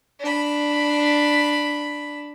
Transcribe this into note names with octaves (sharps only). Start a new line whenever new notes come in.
D4 B5